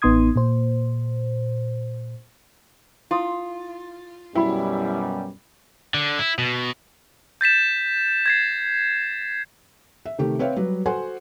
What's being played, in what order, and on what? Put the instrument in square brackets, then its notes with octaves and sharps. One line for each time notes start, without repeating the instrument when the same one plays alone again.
[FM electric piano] A1 B3 D#4 C6 D#6 G#6
A#2 C5
[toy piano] E4 C6 D#6 [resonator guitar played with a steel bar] F4
[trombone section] F#2 B2 G3 [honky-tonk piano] E4 [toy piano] G5 B5
[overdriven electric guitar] D3
E4
B2
[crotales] G6 A6 B6 E7
G#6 A6 C7
[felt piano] E5
C3 D#3 A3 G4
C4 B4 C#5 E5 F5 G5
F#3 G3 B4
F#4 A4 C5 F#5 G#5 C6